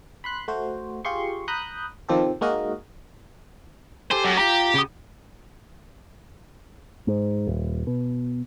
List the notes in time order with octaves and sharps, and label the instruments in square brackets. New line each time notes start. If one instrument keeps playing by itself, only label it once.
[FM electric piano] B5 C6 F#6
A3 F#4 C5
F4 G4 G#4 C6 C#6
A#5 B5 D#6 F#6 G6
C3 D#3 F3 C4 G4 A4
G#3 A#3 D#4 F#4 A#4 D#5
[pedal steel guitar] G4 A4 G#5 [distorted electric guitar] C5
[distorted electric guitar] F#2
[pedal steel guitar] F4 A#5 [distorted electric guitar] G4
[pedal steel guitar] C#3 F#4 D#6
[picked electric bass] G#2
D#1
B2